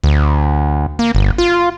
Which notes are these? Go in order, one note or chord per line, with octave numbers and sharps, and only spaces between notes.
D2
A#3
G1
F4